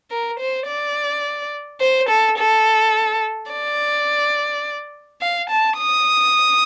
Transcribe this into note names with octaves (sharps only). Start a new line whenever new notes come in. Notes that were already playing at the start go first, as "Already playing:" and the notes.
A#4
C5
D5
C5
A4
A4
D5
F5
A5
D#6